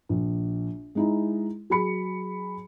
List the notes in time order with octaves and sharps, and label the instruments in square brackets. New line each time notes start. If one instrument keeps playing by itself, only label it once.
[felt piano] A#1
G#3 D#4 E4
F#3 G#4 B5 C#7